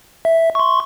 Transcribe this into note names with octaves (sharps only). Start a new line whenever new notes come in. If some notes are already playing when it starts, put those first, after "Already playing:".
E5
C6 C#6